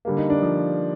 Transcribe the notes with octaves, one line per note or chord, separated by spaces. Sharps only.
D3 G3 A#3
D#4
D4
F3